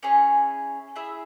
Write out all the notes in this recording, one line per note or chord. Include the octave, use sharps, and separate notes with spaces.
C#4 E4 G#4 C#5
E4 G#4 E5